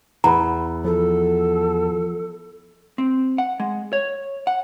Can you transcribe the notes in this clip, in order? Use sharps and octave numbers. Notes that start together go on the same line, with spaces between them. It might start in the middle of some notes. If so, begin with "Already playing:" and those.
E2 A#5 B5
F3 A4
C4
F#5
G#3
C#5
F#5